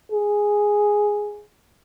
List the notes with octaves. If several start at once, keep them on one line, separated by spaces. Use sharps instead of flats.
G#4